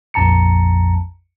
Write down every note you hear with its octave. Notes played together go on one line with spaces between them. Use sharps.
A#1 F2 A5 A#5 C#7